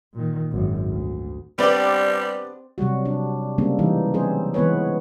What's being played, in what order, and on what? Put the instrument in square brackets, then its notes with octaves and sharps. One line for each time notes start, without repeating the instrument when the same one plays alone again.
[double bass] A#2 D#3
G#1 F#2
D2
[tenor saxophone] G3 [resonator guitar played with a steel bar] B3 D4 G4 [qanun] C4 G5 [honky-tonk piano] B4 D5
[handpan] C3 F#3 G3 F#4
D4
C#3 G3 G#3 A#3 C4 D4
E3 G3 D#4
F#3 C4 G#4 C5
E3 G#3 B3 B4 C#5